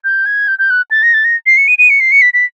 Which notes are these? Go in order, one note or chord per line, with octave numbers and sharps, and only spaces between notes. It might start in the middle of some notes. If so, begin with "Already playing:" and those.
G6
G#6
G6
G6
F#6
A6
A#6
A6
A#6
C7
C#7
D#7
D#7
C#7
C7
C#7
B6
B6